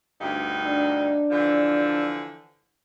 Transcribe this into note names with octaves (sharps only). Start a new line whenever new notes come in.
D2 G2 D#4
D4
D3 E3 F3